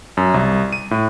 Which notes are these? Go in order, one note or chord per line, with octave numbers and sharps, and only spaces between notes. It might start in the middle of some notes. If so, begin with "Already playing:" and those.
F#2
C2
D#7
A2